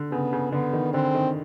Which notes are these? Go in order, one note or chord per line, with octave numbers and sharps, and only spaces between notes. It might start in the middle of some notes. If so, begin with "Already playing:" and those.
Already playing: D3
C#3 B3
C#3
D3 B3
D#3
D3 C4
D#3